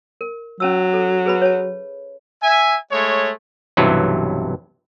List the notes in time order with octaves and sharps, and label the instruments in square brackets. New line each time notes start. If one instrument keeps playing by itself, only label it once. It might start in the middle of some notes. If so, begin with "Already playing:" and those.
[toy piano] A#4
[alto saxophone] F#3 [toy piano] C#4 A5 E6
[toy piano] A4
G#4 B4 B5
C#5 A5
[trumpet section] E5 G#5
G#3 A3 C#5
[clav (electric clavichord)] B1 G2 C3 E3 F#3